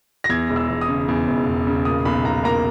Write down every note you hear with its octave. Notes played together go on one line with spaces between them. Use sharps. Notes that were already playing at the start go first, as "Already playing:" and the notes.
A#6
E2 G#6
E1
E6
E1
D#6
C#3
E2
E1
E1
C#3
A#2 D#6
B1 B5
B1 A#5
A#3 A#5